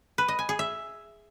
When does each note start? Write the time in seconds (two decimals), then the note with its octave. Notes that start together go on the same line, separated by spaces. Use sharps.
0.18 B4
0.28 D#5
0.39 G#5
0.49 G#4
0.59 E5